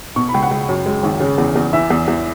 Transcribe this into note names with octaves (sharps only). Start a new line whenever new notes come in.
B2 C#6
B5
C#2
F#5
C#2
F#2
G#3
G#1
C#3
E2
E2
E3 E5
E2
E2